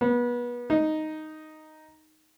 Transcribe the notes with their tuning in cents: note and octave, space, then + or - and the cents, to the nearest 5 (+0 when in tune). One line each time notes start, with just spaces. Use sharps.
B3 -30
D#4 +0